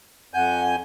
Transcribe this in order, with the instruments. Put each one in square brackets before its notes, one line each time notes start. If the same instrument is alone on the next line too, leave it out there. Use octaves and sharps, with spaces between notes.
[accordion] F2 G#5 G6 [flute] F#5